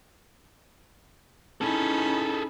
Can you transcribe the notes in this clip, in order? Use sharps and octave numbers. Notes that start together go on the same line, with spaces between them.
C#4 D#4 E4 G#4 A4 B5